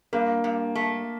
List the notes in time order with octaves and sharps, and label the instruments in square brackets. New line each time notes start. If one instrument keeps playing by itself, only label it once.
[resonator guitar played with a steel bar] G2 [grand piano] A#3
[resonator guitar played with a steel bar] G2
A3